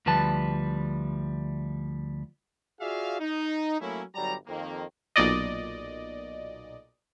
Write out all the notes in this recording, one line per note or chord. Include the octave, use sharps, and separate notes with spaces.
D2 F3 G3 B4 A5
F4 F#4 G#4 D5 E5 F5
D#4
F#3 A3 A#3 C#4 E4
G1 F#3 G3 D5 A#5
F2 D#3 A#3
B1 A#2 D5 D#5